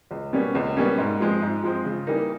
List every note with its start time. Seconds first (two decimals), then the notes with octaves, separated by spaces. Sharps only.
0.11 C#2
0.33 B2 G3 A#3 C#4
0.55 C#2
0.77 B2 G3 A#3 C#4
0.98 G#2
1.20 F3 G#3 C4
1.42 G#2
1.63 F3 G#3 C4
1.85 C#3
2.07 E3 G3 A#3 D#4